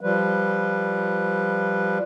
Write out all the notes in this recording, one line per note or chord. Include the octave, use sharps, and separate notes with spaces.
F3 G3 B4